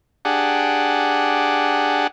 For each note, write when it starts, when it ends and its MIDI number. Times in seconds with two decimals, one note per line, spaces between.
0.25 2.07 62
0.25 2.07 67
0.25 2.07 68
0.25 2.07 78